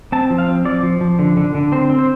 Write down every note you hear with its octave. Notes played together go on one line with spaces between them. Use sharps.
C4 A5
F3
F5
C4
F3 D5
F3
F3
D3
D3
D3
C4 C5
C4
C5